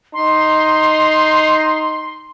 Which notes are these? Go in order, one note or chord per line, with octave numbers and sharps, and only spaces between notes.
D#4 C6